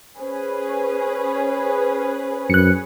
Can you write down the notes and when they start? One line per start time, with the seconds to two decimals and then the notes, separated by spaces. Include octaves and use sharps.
0.20 C#4 G#4 B4 C5
2.50 F#2 F#6 C#7